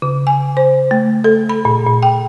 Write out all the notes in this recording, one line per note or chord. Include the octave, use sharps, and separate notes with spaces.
C#3
G#5
C5
A3
A4
B5
A#2
A#2
G5